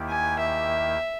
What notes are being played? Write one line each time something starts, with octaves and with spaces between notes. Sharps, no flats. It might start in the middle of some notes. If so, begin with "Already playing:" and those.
Already playing: D#2 D#3 A#3 E4 G4
G#5
E5